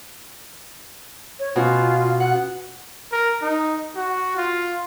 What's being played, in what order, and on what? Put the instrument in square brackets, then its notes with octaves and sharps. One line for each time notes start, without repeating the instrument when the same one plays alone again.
[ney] C#5
[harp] B2 C#4 [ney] F4
[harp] F#5 F#6
[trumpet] A#4
D#4
F#4
F4